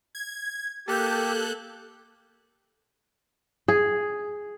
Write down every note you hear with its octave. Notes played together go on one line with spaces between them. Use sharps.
G#6
A#3 G4 A4 F#6 G6
G#4